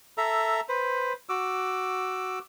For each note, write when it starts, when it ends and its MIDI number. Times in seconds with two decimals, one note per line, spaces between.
0.18 0.61 69
0.18 0.61 76
0.18 0.61 82
0.69 1.13 71
0.69 1.13 72
1.29 2.39 66
1.29 2.39 86
1.29 2.39 88